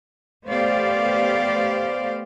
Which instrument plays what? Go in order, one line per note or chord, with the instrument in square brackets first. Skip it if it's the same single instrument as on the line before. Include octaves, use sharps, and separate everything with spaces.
[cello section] A3 B3 G4 C5 D5 F5